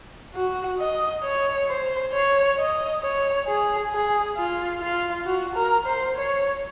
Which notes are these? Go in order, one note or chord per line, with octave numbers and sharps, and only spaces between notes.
F#4
D#5
C#5
C5
C#5
D#5
C#5
G#4
G#4
F4
F4
F#4
A#4
C5
C#5